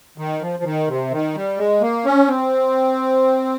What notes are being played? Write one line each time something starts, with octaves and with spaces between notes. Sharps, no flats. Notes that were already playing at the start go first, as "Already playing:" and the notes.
D#3
F3
F3
D#3
C3
D#3
G3
G#3
A#3
C#4
C4